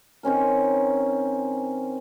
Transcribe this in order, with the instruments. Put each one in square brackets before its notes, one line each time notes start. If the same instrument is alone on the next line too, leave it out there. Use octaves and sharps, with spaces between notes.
[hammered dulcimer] D#3 C4 C#4 A#4